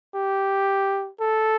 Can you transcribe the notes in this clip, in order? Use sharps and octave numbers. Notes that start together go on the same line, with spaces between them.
G4
A4